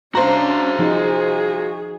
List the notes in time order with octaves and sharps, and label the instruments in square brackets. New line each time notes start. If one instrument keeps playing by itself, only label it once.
[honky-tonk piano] C2 C5 A#5 [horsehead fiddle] C#4 D4 [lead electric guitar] F#4 F5
[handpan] F3 D#4 [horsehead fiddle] G#4